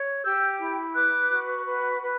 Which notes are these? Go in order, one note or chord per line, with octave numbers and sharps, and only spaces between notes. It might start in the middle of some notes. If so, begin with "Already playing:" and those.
Already playing: C#5
G4 E6 G6
E4
B4 D6 F#6
F#4
B4
B4